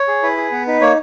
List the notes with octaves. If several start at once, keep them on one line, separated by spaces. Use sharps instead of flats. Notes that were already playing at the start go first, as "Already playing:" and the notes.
Already playing: C#5
G#4
E4 B4
G#4
B3
D#4 B4
A#3 C#5